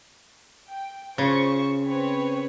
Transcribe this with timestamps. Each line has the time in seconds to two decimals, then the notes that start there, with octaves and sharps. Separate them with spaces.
0.69 G5
1.18 C#3 F4 C5 C#6
1.84 C4 B4 C#5